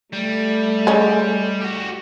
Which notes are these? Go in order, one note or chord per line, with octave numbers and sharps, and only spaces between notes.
G3 A3
G#3 C#4
F#4 G4